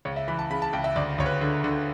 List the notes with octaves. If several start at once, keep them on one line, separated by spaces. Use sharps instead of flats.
C#2 C#5
E5
E3 B5
A5
C#3 B5
A5
C#2 G5
E5
D2 D5
D2 C#5
B4
D3
D3